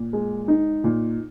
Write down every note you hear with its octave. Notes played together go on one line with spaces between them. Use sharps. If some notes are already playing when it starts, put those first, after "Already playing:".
Already playing: A#2
G#3
D#4
A#2